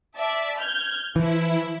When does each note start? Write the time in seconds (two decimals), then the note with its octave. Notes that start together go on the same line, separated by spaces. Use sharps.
0.16 D5 E5 A5
0.59 F6 G6 G#6
1.16 E3 F3 E4